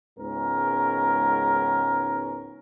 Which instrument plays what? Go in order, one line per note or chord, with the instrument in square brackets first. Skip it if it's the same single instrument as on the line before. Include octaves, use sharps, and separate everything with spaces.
[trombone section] C#2 G#2 B3 C#4 D#4 A#4